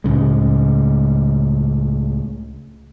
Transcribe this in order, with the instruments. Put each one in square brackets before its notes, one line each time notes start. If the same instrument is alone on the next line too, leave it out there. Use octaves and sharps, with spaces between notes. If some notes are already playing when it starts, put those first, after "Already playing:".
[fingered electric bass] C#2 A2 C#3 G#3